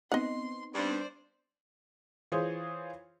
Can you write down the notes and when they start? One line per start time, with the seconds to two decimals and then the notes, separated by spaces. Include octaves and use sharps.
0.12 B3 C4 D#4 D#5 F#5 C6
0.75 G2 C5 D5
2.32 E3 F4 G#4 C5 C#5